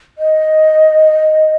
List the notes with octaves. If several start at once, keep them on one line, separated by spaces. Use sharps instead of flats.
D#5